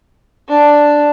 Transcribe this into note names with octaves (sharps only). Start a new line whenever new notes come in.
D4